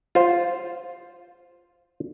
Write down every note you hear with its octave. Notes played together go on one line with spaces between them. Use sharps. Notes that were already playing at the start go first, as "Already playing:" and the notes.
F4 C5